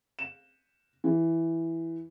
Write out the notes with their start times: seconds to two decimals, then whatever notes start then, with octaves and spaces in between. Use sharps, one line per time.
0.19 E7
1.04 E3